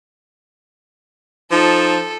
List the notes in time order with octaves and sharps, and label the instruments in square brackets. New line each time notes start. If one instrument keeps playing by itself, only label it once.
[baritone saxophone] F3 [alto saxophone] D#4 [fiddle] A4